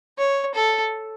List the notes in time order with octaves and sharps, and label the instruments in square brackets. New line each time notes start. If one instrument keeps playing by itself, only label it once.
[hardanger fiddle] C#5
A4